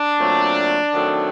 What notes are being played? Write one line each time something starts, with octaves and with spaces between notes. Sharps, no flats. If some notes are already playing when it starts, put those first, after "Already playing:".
Already playing: D4
A#2 F#3 A3 C4
D#3 F#3 A3 C4